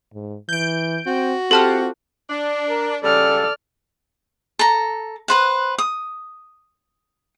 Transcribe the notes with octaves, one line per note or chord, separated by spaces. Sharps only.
G#2
E3 G6 D7
C4 F#4
C4 F4 G4 A4 F#5 A5 F6
D4
A#4
C#3 G3 A4 D5 F6
A4 A#5
B4 C5 F#5
D#6